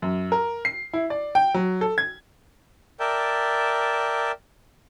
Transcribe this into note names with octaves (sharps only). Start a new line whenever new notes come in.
F#2
A#4
C7
E4
D5
G5
F#3
A4
G#6
A#4 D5 E5 G5 A5